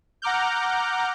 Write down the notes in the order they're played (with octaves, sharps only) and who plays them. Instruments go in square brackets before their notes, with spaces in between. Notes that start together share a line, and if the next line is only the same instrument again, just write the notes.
[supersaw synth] F#5 A#5 D6 F6 G6